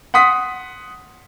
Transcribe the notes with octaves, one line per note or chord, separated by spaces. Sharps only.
F#5 C6 D#6 B6